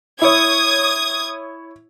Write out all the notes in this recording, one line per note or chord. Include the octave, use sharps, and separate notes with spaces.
E4 C#5 D#6 G#6